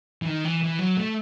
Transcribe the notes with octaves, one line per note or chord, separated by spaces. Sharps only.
E3
D#3
E3
E3
F#3
A3